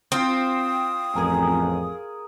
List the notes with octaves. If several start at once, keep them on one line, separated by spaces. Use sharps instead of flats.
C4 F4 F5 G5 D#6
A1 F2 G#4 A#4 G#5